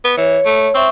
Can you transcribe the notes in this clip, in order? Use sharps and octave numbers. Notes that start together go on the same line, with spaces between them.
B3
E3 C#5
A3
C4 E5 C#6